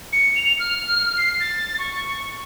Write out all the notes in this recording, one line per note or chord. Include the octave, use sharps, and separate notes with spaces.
C#7
F7
F6
C7
A6
C#6